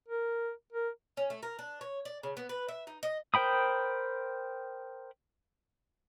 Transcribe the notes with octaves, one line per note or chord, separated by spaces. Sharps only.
A#4
A#4
C#4
A3
A#4
D4
C#5
D5
C#3
B3
B4
E5
D#4
D#5
A#4 C5 G5 B5 D#6